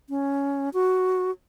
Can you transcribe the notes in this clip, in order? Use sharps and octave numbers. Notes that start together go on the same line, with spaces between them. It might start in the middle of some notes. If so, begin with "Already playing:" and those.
C#4
F#4